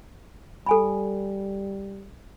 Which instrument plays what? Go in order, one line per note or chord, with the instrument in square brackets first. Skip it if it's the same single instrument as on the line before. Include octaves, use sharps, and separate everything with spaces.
[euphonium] G3 [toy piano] A4 G#5 B5